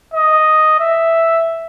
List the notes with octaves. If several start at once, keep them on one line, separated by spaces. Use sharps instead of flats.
D#5
E5